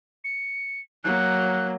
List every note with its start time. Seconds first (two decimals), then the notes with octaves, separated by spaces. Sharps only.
0.24 C#7
1.04 F#3 A#3 F#6